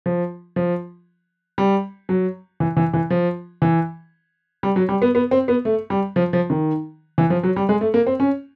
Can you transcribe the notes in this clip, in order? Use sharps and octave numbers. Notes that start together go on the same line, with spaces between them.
F3
F3
G3
F#3
E3
E3
E3
F3
E3
G3
F#3
G3
B3
B3
C4
B3
A3
G3
F3
F3
D#3
E3
F3
F#3
G3
G#3
A3
A#3
C4
C#4